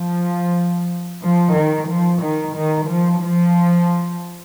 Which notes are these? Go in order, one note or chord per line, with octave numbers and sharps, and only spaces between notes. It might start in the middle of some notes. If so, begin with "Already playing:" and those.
Already playing: F3
F3
D#3
F3
D#3
D#3
F3
F3